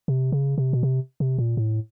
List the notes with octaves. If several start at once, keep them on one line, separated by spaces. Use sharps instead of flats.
C3
C#3
C3
B2
C3
C3
A#2
A2